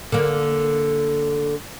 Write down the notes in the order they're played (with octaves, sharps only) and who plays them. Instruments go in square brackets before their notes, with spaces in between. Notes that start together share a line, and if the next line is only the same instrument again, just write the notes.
[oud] D3 A#3